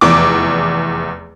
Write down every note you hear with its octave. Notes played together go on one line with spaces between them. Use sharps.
F1 E2 D6